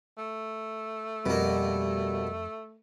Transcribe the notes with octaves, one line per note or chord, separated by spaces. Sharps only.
A3
F2 B2 G3 A#3